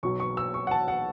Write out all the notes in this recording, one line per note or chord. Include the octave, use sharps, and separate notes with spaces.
B1 B2 F#3 C#6
C#6
E6
C#6
F#5
A5
F#5